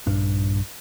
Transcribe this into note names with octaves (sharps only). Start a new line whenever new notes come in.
A#1 G2 D4